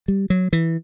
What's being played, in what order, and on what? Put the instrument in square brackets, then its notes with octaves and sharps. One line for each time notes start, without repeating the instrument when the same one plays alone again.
[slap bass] G3
F#3
E3